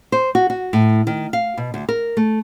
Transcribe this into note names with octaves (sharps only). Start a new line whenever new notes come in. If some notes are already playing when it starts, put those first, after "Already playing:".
C5
F#4
F#4
A2
D#3
F5
B2
D2
A#4
A3